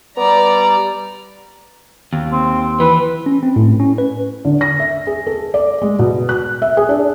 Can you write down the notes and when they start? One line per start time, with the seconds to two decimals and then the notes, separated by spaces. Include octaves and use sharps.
0.17 G3 B3 D5 A#5
2.13 D#2
2.32 C4
2.80 E3 B4
3.26 C#4
3.43 C4
3.56 A2
3.80 C#4
3.98 B4
4.45 D3
4.61 A#6
4.80 E5
5.07 G#4
5.27 A4
5.54 D5
5.82 G#3
5.99 B2
6.29 F#6
6.62 E5
6.77 G#4
6.89 D4